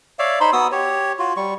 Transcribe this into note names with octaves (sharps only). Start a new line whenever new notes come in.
C#5 D5 E5 F5
D#4 C5 B5 C6
B3 F#4 D#6 E6
G4 C#5
F4 F#4
G3 C#6